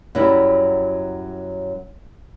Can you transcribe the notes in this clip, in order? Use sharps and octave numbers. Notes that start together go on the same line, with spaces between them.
F#2 F#3 G3 E4